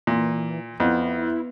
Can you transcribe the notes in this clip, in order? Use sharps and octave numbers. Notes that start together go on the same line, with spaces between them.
A#2 E3
F2 B3 E4